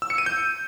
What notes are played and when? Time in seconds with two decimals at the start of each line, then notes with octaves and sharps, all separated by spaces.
0.02 E6
0.10 C#7
0.18 D#7
0.26 G6